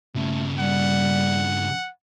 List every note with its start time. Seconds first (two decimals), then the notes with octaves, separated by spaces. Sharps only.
0.16 G2 C#3 A3
0.59 G3 F#5